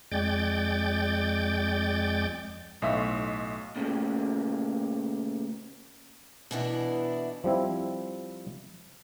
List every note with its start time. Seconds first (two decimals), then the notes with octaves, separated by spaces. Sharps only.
0.11 F2 G#3 D5 G5 G6 A6
2.82 B1 A2 D#5 E5
3.76 A#2 C#3 A3
6.51 B2 E3 B3 D4 E4
7.44 F3 G3 C4 E4